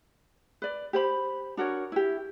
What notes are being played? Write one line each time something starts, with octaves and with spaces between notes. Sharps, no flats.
B4 D5
G4 C5 B5
D4 F#4 A#4 C#5
E4 G4